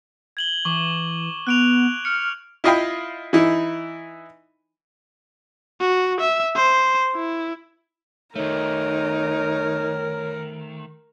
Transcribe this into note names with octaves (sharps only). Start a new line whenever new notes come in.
G#6 F#7 G7
E3 C#6 D6 F#7
B3 F#6 D7 F7
F6 C#7
E4 F4 D#5 F5 G5 B5
E3 D#4 E4
F#4
E5
C5
E4
D#3 A3 D#4 A#4 C#5